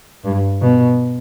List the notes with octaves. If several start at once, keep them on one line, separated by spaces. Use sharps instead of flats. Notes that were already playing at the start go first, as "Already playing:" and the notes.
G2
B2